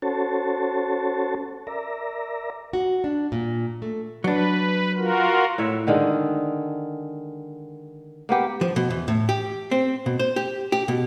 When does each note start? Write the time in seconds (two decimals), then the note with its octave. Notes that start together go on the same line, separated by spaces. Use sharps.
0.02 C#4 F#4 A4 C5 C#5 A5
1.67 A#4 D5 E5 A#5
2.73 F#4
3.04 D4
3.32 A#2
3.82 A3
4.24 F#3 D4 B4
4.97 F4 F#4 A#4
5.58 A2 C#5 E5
5.87 D3 D#3 G#3
8.29 A#3 B3 G4
8.61 F3
8.76 B2
8.90 E2
9.08 A2
9.29 G4
9.71 C4
10.06 B2
10.19 C5
10.36 G4
10.72 G4
10.88 B2